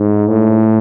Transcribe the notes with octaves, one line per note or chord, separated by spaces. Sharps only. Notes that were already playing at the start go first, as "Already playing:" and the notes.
Already playing: G#2
A2